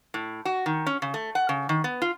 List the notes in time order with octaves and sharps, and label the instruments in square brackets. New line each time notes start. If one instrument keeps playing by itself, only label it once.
[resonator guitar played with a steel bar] A2
F#4
D#3
C#4
C#3
A3
F#5
C#3
D#3
B3
F4